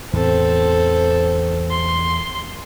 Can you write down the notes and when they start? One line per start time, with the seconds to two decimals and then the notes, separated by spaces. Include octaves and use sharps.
0.14 E2 A2 E3 C4 A4
1.71 C6